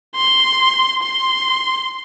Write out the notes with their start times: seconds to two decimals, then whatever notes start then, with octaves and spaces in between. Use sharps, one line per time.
0.16 C6
1.02 C6